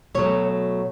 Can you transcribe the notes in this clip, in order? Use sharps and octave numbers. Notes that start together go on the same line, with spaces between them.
B2 F#3 A3 C#5